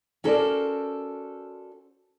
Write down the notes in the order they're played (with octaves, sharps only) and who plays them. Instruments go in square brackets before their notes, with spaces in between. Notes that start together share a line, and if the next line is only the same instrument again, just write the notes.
[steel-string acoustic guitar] C#4 F#4 A4 A#4 C5 D5